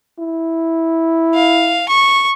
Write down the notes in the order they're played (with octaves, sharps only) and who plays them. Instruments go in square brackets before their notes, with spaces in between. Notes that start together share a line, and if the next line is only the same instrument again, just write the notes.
[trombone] E4
[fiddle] F5
C#6